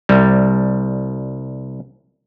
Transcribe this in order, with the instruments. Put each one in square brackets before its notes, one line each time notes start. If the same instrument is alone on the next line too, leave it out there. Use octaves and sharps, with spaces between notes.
[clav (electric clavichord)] C2 G3